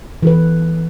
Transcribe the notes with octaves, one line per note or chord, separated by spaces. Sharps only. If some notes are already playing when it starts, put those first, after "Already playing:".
E3 A4 B4